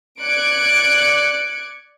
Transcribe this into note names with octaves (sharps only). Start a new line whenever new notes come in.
D5 F#6 G#6 C#7 D7